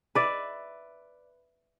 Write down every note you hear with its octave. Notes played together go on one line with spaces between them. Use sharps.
B4 D5 E5